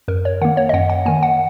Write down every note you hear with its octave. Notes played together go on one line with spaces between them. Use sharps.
F#2 A#4
C#5
D#3 A#3 F#5
C#5
D#5
F#2 F#5
F#5
D#3 A#3 G#5
F#5